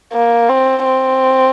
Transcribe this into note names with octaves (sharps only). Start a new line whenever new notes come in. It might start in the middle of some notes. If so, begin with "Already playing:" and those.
A#3
C4
C4